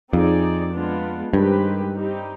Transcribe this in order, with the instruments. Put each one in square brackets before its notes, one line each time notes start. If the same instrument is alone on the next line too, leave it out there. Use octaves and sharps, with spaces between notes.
[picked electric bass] F2 [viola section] C4 D#4 G#4 D5
[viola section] G#3 B3 D4 F4
[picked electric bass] G2 [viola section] D#3 G#3 C4 G4 B4
[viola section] G3 C4 D#4 G4